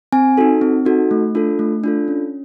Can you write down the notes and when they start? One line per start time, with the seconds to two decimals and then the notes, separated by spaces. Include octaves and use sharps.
0.12 C4 G#5
0.37 D#4 F#4 A4
0.61 C4
0.85 D#4 F#4 A4
1.11 A3
1.35 D4 F4 A4
1.59 A3
1.84 D4 F4 A4
2.08 C#4